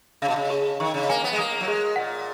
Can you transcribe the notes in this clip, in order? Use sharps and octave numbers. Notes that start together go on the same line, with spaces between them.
C#3 F5
B2
C#3
G#4
D#3 C#6
C#3
A#3 G#5
B3
G#3
A#3 D#6
F#3
G#3 G#4
A#2 F#5